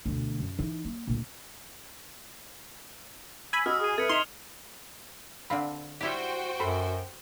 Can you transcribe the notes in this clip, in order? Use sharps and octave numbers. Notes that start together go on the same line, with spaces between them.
D2 B2
F#2
E3 D#4
A#3
D2 A#2
G#5 B5 E6
F#4 D#5 D#6 F6
G#4 D#6 D#7
A4 B4 E5 G#6 C#7
D#4 C6 E7 F7 G7
D3 C4 D4 F5 B5
G3 E4 F#4 G4 C5 G5
F#2 A4 B5 C6